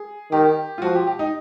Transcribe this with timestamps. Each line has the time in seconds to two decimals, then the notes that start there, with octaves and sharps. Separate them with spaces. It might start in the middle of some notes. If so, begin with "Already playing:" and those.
Already playing: G#4
0.31 D#3 G4
0.78 F4
0.82 F3 F#4
0.95 G4
1.07 G4
1.19 D#4